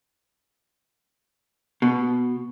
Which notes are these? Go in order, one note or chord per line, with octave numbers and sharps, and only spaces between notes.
B2